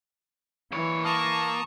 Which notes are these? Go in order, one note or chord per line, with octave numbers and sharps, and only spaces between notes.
A#2 E3 C#5
A#3 A5 A#5 C#6 D#6